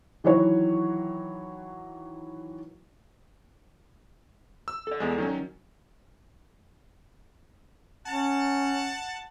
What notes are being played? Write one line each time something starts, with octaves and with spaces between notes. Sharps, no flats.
D#3 E3 F#3 E4 F#4 C#5
E6
A4 D5
E2 G#3
D#3 F#3 C#4
C#4 F#5 A5